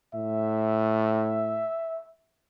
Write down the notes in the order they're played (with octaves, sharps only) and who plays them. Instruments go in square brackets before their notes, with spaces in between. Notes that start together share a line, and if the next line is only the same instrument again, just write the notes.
[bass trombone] A2 [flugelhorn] E5